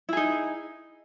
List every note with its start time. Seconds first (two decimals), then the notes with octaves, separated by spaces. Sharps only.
0.09 E4
0.13 G#4
0.17 D#4